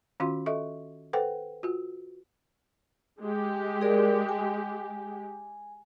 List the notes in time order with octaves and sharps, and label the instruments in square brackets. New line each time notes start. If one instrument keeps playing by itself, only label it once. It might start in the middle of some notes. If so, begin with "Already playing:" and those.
[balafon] D#3 C#4 F4 F#4 F5 C6
A4 D#5 E5 C#6
A4 B4 C5 F#5 G5
F4 F#4
[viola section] G#3 G4
[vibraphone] G#4 A#4 D5
G#5